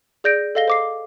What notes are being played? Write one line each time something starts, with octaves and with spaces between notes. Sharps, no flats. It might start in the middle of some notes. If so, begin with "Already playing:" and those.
G#4 D5 G6 A#6 D7
A4 D#5 F5 A#6 G7
C5 D6 C7